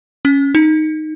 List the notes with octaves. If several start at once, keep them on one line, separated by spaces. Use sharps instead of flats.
C#4
D#4